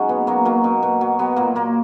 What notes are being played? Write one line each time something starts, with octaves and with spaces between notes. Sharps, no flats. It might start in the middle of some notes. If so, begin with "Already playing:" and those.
Already playing: F#3 G#3 C#4 D#4 F#4
B2 B3
F#3 A#3
F#3 A#3
B2
B2
F#3
F#3 B3
A#2 A#3
A#2 A#3